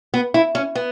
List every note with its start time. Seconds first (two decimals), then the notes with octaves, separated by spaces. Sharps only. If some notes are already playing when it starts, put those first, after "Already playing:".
0.14 B3
0.34 E4
0.55 C#4
0.75 B3